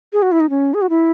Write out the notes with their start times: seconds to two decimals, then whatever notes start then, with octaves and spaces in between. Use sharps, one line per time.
0.13 G#4
0.22 F#4
0.32 E4
0.40 D#4
0.50 C#4
0.74 G#4
0.82 F#4
0.90 E4